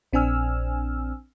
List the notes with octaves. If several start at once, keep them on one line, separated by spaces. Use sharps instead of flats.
A#1 C4 D4 G#5 E6 F6